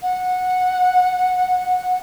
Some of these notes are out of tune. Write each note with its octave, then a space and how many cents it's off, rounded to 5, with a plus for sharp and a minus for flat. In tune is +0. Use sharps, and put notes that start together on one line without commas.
F#5 -15